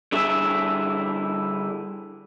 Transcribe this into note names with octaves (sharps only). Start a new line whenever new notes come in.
D3 G3 E4 G#4 E5